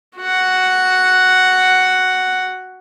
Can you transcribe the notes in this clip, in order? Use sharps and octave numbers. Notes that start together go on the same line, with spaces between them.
F#4 F#5